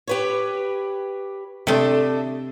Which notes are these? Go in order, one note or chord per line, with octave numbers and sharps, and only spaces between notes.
G4 B4 C#5
C3 A3 D4 D#5 E5